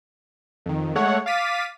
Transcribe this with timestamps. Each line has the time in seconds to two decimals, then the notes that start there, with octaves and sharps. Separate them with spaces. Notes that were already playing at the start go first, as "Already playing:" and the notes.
0.66 F2 D#3
0.95 G#3 A3 C#5 F#5
1.26 F5 D6 A6 B6 D#7